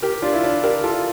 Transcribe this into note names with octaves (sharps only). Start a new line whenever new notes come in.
G4 A#4
D4 F4
E4
D4
G4 A#4
F4 A4